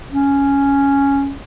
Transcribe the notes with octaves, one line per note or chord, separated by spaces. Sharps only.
C#4